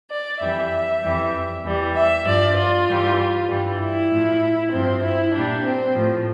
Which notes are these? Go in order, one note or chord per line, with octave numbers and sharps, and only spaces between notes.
D5
F2 E3 G3 E5
F2 E3 G3
E2 E3 G3
E5
G2 F3 D5
F4
G2 E3 G3
G2 E3 G3
E4
A2 F3
G2 F3 C4
E4
A#2 G3 D4
C4
A2 F3